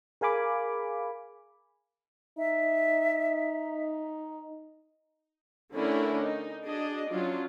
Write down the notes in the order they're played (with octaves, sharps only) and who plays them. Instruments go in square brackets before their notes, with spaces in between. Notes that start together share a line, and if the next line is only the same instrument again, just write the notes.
[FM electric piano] G#4 A#4 F5 G#5 B5 D6
[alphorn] D#4 [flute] E5
[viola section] D3 A3 C#4 D4 E4 A#4
D#4
D4 F#4 G#4 D#5
F#3 C#4 D4 F4